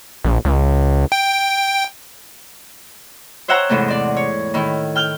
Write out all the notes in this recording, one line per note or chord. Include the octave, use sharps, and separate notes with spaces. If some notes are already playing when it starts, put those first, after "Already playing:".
A#1
C#2
G5
C5 C#5 E5 F#5 G5 A#5
E2 G#2 C3 A3 C4
C4 D5
C#5
A2 D#3 E4
G5 F6 G6